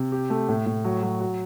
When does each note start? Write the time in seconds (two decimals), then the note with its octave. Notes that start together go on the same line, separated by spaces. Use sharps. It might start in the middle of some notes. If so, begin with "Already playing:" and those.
Already playing: C3
0.12 G4
0.30 A3
0.49 A2
0.66 A2
0.85 F#3
1.03 F#3
1.20 F#4